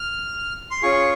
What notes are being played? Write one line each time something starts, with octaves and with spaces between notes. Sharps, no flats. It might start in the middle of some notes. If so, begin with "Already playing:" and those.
Already playing: F6
C6
C#4 F4 G#4 C#6